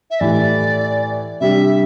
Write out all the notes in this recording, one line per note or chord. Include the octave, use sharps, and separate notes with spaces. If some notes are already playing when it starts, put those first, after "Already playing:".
E5
A2 E3 A3 E4 G4 D5
C3 G3 D4 G4 E5